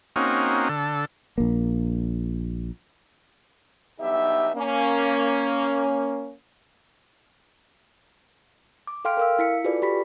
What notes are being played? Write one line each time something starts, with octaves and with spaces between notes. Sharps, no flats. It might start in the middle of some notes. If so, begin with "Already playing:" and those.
A#3 C4 C#4 D#4 F#4
D3 A4
A#1 A#3
B1 G2 B3 D#4 G4 E5
A#3 C#4
D6
A4 F5 G5 C6 F6 D7
A#4 F5 E6
E4 B6 C#7
F4 F#4 G#4 A4 B4 D5
G4 B5 B6